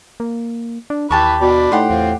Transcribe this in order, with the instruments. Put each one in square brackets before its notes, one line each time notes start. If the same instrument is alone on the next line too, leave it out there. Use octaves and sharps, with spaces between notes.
[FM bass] A#3
D4
[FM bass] D#2 [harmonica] E3 B4 [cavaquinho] G4 A5 C#6
[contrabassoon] B2 [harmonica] D4 D5 B5
[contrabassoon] A2 [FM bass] D#4 [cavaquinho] G4 F#5 C6
[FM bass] E2 [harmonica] C4 F4